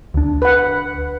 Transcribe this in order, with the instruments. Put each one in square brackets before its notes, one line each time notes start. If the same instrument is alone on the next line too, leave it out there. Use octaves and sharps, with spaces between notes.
[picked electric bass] D2 D4
[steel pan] B4 F#5